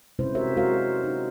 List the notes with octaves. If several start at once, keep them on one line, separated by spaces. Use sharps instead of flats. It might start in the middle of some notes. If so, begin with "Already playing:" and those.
C3 G#3 C#4 E4 B4 C5
F#4 G4 A#4 C5 C#5 E5
G#3 F#4 A#4 C5 F5
D#4